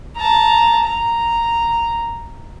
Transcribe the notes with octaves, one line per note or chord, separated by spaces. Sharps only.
A5 A#5
A#5